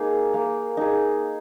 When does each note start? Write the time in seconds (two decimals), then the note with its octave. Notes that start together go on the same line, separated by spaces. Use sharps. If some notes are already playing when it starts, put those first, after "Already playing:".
Already playing: A#3 D#4 G#4
0.34 A#3
0.77 D#4 G#4